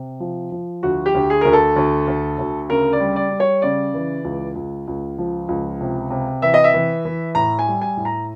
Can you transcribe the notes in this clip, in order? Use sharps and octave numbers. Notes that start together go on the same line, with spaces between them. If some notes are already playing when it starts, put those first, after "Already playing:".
Already playing: C3
F3
F3
D2 F#4
G4
D2
G#4
D2 A#4
A4
D2
D2
D2
C#3 A#4
D5
G3
D5
G3
C#5
C#3 D5
E3
C#2
C#2
C#2
F3
C#2
C3
C3
E3 E5
D#5
E5
E3
E3
A2 A#5
G#5
G3
G#5
A2
A#5